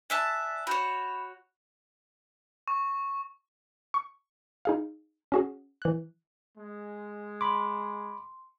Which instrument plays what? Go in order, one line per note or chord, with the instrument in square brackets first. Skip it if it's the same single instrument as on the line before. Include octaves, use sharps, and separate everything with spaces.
[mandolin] D5 E5 A5 [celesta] G#5 F#6 B6
[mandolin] F#4 C#5 [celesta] B5 G6 E7
[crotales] C#6
[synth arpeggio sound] C#6
D#4 G#4 F5
C#4 F#4 G#4
E3 F#6
[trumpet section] G#3
[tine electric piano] B5 D6 [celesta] C6